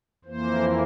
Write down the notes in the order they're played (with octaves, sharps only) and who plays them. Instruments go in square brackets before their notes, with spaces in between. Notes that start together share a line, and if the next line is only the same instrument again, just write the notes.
[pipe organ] F2 E3 A#3 C5